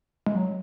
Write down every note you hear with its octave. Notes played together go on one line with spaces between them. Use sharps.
G#3
F#3